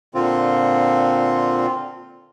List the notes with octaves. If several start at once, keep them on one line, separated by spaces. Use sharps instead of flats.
A#2 D3 C4 F4